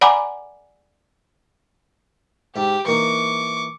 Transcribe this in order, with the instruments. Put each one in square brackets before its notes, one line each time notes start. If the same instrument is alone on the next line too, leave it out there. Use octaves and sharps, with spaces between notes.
[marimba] D5 F#5 G#5 A#5 B5 D6
[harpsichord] G#2 [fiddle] G4
[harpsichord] E3 A#3 D#4 [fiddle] C#6 D6